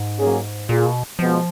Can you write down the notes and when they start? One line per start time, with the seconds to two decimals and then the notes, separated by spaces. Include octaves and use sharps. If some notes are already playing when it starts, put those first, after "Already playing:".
Already playing: G#2
0.18 F#3 A#3 C#4 G#4
0.69 A#2 A#3 F4 G#4
0.86 B2
1.19 B2 F3 G#3 B3 F4